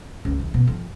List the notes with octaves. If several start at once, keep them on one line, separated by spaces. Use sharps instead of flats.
C#2
E3
B2
F2